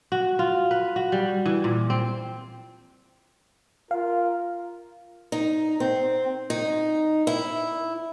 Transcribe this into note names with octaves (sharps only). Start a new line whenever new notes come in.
F#4
F4
B4
F#4
G3
E3
A#2
C4
F4 A#4 F5
D#4
C4
D#4
E4